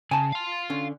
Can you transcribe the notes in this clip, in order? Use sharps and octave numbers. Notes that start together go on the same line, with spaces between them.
C#3 G#5 A5
F5 C6
D3 C#4